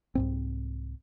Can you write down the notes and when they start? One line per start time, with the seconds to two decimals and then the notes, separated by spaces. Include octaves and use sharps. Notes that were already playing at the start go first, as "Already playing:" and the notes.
0.15 C2 G#2 C4